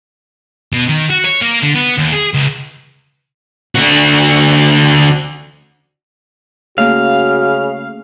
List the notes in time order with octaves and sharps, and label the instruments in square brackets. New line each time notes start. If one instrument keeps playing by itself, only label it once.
[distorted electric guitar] B2
D#3
F#4
C#5
A#3
D3
B3
D#2
G#4
C#2
D3 F#4
[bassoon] C#3 [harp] A3 A#3 C#4 [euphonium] F#4 [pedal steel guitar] F5